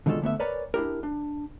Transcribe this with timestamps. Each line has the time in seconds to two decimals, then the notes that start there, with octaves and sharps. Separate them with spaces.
0.06 B2 D3 D#3 G#3 F4 A4
0.22 D3 A3 B3 E5
0.39 A#4 B4 C#5 D5 G#5 A#5
0.74 D4 E4 G4 A#4
1.03 D4